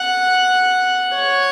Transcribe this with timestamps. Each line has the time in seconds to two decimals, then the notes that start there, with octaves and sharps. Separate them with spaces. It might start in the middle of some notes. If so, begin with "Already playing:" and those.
Already playing: F#5
1.16 C#5